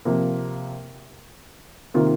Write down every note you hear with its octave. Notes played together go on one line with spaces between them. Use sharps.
C3 F3 A#3
C3 D#3 A#3 F4